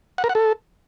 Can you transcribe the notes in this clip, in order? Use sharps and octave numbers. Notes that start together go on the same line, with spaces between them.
F#5
A#4
F#5
A4